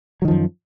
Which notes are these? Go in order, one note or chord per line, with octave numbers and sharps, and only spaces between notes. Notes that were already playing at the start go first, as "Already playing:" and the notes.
F#2 D#3 F3 F#3